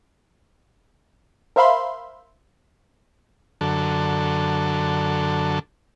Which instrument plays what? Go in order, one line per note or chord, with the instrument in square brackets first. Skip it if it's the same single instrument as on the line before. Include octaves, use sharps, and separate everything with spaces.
[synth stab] A#4 C5 E5 F5 B5 C6
[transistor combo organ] F#2 D3 A4